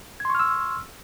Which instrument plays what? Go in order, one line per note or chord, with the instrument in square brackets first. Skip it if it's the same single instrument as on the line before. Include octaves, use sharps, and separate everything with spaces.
[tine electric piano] G#6
C6
C#6
F6
E6